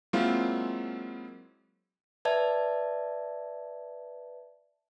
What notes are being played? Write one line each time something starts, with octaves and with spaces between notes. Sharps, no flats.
F#3 G#3 A#3 C4 E4 F4
B4 D5 E5 A5 G#6